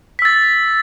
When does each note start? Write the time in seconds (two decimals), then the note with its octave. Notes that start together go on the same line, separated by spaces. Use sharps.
0.19 B6
0.22 E6
0.25 A6